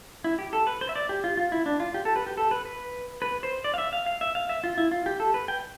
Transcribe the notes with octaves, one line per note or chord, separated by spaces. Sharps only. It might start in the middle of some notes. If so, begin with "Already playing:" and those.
E4
G4
A4
B4
C5
E5
D5
G4
F4
F4
E4
D4
F4
G4
A4
B4
G4
A4
B4
B4
B4
C5
D5
F5
E5
F5
F5
E5
F5
E5
F4
E4
F4
G4
A4
B4
G5